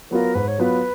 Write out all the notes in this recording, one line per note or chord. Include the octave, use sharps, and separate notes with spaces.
F#3 B3 F4 A#4
G#2 B4
C#5
F#3 B3 F4 B4